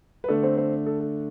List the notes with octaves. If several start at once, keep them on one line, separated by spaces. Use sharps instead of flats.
B4
D3 A3 D4 A4
C4 C5
C4 C5
A4
A4